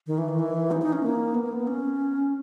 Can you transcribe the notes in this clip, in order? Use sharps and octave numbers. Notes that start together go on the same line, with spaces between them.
D#3
E3
D#3
E3
D#4
D#4
C#4
A#3
B3
A#3
B3
C#4